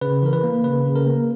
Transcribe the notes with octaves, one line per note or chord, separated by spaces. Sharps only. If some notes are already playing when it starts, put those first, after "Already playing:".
C#3 B4
E3 A#4
B4
A#3
C#3 B4
C#3
A#4
A#3